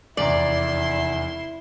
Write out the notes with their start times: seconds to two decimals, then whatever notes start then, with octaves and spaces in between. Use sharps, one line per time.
0.17 F1 E2 E4 D5 A#5 C6